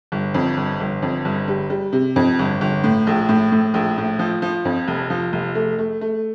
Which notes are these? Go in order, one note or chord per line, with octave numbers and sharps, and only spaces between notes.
G1
F2
G1
G1
F2
G1
G3
G3
C3
F2
G1
G1
A2
A#1
A2
A2
A#1
A2
F3
F3
F2
F1
F3
F1
A3
A3
A3